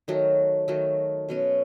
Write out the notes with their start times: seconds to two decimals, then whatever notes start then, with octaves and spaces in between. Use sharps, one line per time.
0.08 D#3 F#3 A3
0.68 D#3 F#3 A3
1.29 B2 F#3 C#4